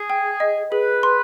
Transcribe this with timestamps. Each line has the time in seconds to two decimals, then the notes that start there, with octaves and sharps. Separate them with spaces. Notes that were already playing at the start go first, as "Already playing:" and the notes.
Already playing: G#4
0.10 G5
0.40 D#5
0.72 G#4 B4
1.03 C6